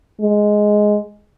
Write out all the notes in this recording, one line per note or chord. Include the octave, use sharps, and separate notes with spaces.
G#3